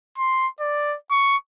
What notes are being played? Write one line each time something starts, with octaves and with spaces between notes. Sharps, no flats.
C6
D5
C#6